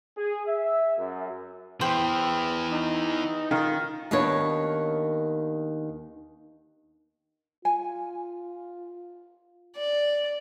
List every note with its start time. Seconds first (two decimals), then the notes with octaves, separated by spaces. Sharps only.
0.18 G#4
0.47 E5
0.98 F#2
1.81 E3 B3 C5 G5
2.71 D#4
3.51 D#3 F4
4.11 D#2 D#3 B3 D4 C#5
7.65 F4 G#5
9.76 D5